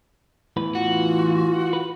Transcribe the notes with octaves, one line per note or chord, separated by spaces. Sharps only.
E2 A2 E3 B4
F4 F#4
B4